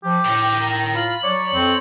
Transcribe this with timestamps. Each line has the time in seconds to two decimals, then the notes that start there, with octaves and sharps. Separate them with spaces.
0.03 F3 G4
0.25 A2 A#4 G5
0.62 A#5
0.95 F4 B5
1.23 F#3 C#5 D5
1.54 F2 C4